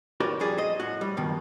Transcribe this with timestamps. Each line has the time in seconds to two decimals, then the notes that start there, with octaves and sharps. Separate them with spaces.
0.20 F#4 G4 A#4 B4 C#5 D5
0.40 F2 G3 G#4 D5
0.57 C5 D#5
0.80 A2 F#4
1.01 G3
1.17 G2 B2 D#3 F3